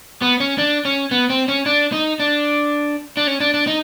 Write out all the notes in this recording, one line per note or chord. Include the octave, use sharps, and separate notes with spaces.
B3
C#4
D4
C#4
B3
C4
C#4
D4
D#4
D4
D4
C#4
D4
D4
D#4